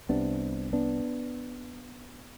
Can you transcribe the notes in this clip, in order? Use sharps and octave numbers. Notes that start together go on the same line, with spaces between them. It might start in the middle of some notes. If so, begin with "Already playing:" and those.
C2 C3 B3 D4
B3 D4